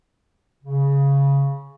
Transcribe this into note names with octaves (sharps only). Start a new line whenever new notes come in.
C#3